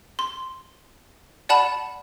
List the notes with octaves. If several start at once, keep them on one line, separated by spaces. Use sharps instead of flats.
C6
D5 F#5 A5 B5 E7